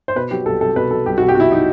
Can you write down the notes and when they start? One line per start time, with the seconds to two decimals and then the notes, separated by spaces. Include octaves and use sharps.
0.08 C5
0.16 B2 B4
0.31 F#3 G4
0.46 C2 A4
0.61 C2 A4
0.76 B2 B4
0.91 F#3 A4
1.06 C2 G4
1.18 F#4
1.21 C2
1.28 G4
1.35 B2 E4 F#4
1.51 F#3 D#4